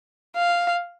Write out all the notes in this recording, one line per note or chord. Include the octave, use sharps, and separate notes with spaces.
F5